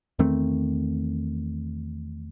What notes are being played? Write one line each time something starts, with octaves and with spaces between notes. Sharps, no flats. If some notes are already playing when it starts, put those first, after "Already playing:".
E2 D#3 A3 C4